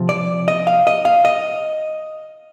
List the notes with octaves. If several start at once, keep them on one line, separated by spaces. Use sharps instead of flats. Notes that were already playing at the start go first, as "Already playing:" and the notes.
Already playing: C3 F3 C4
D5
D#5
F5
D#5
F5
D#5